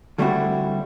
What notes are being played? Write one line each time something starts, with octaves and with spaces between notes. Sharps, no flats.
D3 G3 A3 C4 E4 F#4